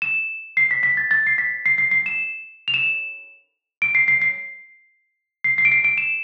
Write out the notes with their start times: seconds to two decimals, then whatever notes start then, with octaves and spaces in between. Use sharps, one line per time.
0.02 E7
0.57 C7
0.71 B6
0.83 B6
0.97 A6
1.11 A6
1.27 C7
1.38 B6
1.66 C7
1.78 C7
1.91 C7
2.06 E7
2.68 F7
2.74 E7
3.82 D7
3.95 C7
4.08 C7
4.22 C7
5.44 C7
5.58 C7
5.65 D7
5.72 C7
5.85 D7
5.98 E7